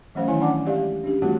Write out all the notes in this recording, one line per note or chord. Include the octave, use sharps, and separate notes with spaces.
E3 F#3 A3 C#4 C5 F5
D#3 F#3 E4 C#5 G#5
C#4 D4 D5 F#5 A5 D6
G#3 G4 D5 E5 F5
C#4 D4 G4
E3 G3 A3 C4 F4 F#4